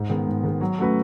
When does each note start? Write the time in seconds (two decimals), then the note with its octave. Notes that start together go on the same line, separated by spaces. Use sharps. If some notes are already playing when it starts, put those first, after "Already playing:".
Already playing: G#2
0.10 D#3 G#3 B3
0.27 G#2
0.43 D#3 G#3 B3
0.61 F#3
0.78 A3 C#4 F#4 B4